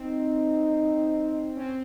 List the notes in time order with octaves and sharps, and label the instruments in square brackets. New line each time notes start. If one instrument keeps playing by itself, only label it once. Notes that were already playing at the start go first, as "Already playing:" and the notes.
Already playing: [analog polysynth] C4 [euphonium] D#4
[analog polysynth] C#4
C4